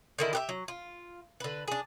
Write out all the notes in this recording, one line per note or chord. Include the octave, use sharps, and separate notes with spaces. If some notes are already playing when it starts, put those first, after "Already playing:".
D3 D#3 E4
G4 B4 E5
F#3
F4
D3 B4
D4 G#4